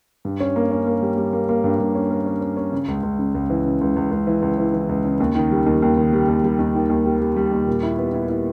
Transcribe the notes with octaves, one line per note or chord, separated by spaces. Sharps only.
G2
C#4
A#3
C#4
A#3
G3
G3
A#3
A#3
G2
G2
C#4
A#3
C#4
C#4
C#4
C#3
C#2
C#2
C#3
C#2
E3
C#3
C#2
C#2
C#2
E3
C#2
E3
E3
C#2
C#3
D#2
D#3
G3
D#2
D#2
D#3
G3
D#2
G3
D#2
D#3
D#2
G3
G3
G3
D#2
A#2
E4
B3
E4
E4